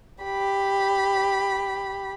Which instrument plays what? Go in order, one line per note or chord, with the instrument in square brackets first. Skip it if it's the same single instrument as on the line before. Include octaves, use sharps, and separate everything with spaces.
[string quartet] G4 B5